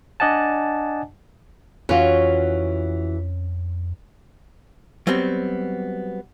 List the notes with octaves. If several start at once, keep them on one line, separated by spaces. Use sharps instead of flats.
D4 D5 D#5 F#5 G#5 A5
F2 E3 C#4 F4 F#4
F#3 G3 B3 C4